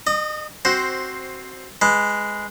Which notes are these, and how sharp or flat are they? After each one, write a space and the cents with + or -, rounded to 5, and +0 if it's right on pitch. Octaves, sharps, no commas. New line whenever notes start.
D#5 -35 D#6 +0
C4 +10 F#4 +15 C5 +0
G#3 +0 B4 +0